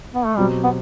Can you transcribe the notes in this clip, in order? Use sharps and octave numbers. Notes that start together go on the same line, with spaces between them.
B3
A3
B2 F#3 G3 C4 G4
B3